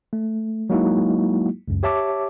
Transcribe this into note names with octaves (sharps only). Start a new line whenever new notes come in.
A3
F#3 G#3 A#3 D#4 E4 F#4
C#2 F#2
G4 C#5 E5 A5 D6